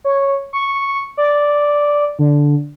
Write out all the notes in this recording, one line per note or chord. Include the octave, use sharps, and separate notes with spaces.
C#5
C#6
D5
D3